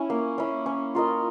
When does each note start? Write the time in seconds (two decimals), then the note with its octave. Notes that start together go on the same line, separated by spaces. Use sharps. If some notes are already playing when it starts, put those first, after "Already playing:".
Already playing: C#4 E4
0.10 A#3
0.38 C#4 E4
0.66 C#4
0.95 F4 A#4 D#5